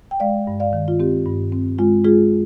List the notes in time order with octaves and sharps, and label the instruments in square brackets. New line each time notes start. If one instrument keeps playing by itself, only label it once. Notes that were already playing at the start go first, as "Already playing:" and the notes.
[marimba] G5
G#3 D5 F5
G2
D5 F5
D#3
F4
C4 G4
G2
C4
G#3 F4
G#3 F4 G#4